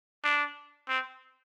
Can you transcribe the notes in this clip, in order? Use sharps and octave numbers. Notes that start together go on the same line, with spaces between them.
D4
C4